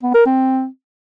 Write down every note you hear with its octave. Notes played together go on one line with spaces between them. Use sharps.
B3
A#4
C4